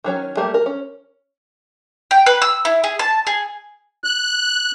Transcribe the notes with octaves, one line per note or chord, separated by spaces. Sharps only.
D#3 F#3 C#4
G3 A3 A#3 G4
A#4
C#4
G5
B4
E6
E4
G#4
A5
G#4
F#6